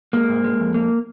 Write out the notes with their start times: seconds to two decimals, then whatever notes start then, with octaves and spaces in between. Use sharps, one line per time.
0.13 G#3 A#3
0.29 G#2
0.44 G#3
0.60 F2
0.74 A#3